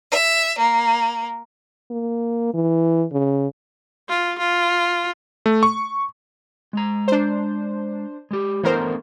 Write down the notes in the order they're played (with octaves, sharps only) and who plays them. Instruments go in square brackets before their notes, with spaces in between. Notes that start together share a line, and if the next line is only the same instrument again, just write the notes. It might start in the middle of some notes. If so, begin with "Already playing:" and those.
[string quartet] E5
A#3
[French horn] A#3
E3
C#3
[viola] F4
F4
[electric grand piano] A3
C#6
[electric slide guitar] G#3 A#5
[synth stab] D4 C5
[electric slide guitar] G#3 G4
[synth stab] E3 A#4 C5 [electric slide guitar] A3 B3 D4